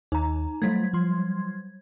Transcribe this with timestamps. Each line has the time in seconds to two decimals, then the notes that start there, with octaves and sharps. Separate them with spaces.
0.12 D#2 D#4 A#5
0.62 F#3 G3 A3 G#6 B6
0.93 F3 C6